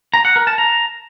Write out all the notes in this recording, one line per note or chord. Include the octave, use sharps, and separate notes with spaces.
A#5
F#5
A#4
A5
A#5